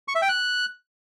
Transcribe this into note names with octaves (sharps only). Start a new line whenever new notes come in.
C#6
E5
G5
F#6